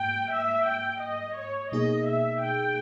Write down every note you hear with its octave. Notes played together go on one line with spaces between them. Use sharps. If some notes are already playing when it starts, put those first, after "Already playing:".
Already playing: G#2 A#3 G5
E5
G5
D#5
C#5
B2 A#3 D#4 G#4 D#5
E5
G5